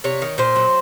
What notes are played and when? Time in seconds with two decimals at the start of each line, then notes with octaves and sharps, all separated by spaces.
0.04 C3 C#5
0.22 D#3
0.38 A#2 C5
0.56 F#3